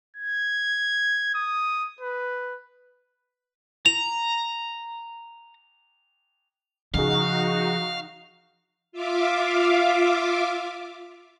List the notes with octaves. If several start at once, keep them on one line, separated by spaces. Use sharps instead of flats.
G#6
D#6
B4
A#5 F7
C#3 F3 D#4 F#4 G#4 F5
F4 E5 F5 D6